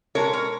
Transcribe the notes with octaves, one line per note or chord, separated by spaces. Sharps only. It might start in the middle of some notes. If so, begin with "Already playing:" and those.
B2 G#3 A#4 C#5
A#4 C#5